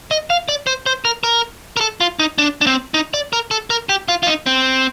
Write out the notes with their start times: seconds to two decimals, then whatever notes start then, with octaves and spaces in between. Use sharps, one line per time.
0.11 D#5
0.30 F5
0.49 D5
0.67 C5
0.86 C5
1.05 A#4
1.23 A#4
1.77 A#4
1.81 A4
2.01 F4
2.19 D#4
2.38 D4
2.61 D4
2.67 C4
2.94 D#4
3.14 D5
3.33 A#4
3.51 A4
3.70 A#4
3.89 G4
4.08 F4
4.23 F4
4.27 D#4
4.46 C4